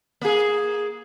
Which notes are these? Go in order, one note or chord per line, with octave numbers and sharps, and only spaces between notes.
A#3 G#4